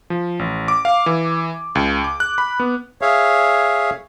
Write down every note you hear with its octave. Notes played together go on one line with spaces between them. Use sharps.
F3
A1
D6
F5
E3
C#2
D6
F#6
B5
B3
G#4 C#5 E5 F5